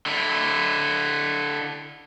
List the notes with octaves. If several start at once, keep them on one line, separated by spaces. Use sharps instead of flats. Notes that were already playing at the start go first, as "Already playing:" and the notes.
D3 E4